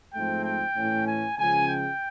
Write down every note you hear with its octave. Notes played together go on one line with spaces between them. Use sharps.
G#2 F3 A3 C4 G5
G5
A2 E3 A3 C#4
G#5
C#2 C#3 F3 G#3 G#5
G5